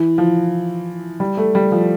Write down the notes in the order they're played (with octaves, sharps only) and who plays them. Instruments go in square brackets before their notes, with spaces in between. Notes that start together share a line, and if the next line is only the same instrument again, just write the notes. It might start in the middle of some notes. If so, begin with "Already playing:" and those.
Already playing: [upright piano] E3
F3
G3
A3
G3
F3